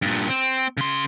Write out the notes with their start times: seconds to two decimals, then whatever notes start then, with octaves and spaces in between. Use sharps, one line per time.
0.02 G2 A#2
0.29 C4
0.77 C#3 C6